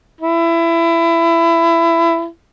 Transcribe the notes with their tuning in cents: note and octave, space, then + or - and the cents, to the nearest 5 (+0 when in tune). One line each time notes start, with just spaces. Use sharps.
E4 +20